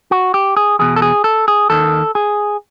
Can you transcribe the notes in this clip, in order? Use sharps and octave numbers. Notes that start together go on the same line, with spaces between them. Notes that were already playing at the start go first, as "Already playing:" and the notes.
F#4
G4
G#4
E2 B2 G#4
A4
G#4
A4
G#4
D#2 D#3 A4
G#4